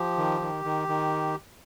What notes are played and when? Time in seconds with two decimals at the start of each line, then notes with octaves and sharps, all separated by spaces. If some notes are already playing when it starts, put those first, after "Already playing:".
Already playing: F3 G4
0.17 D#3
0.41 D#3
0.65 D#3
0.88 D#3